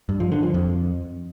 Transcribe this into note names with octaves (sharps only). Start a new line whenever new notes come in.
G2
F3
D3
F3
F2